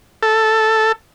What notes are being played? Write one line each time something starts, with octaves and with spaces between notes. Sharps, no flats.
A4